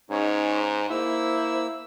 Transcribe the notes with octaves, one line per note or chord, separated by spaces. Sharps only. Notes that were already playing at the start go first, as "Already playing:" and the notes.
G#2 C#4 D#4 C#5
A#3 E4 C5 E6